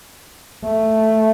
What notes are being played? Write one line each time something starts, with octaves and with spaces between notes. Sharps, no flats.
A3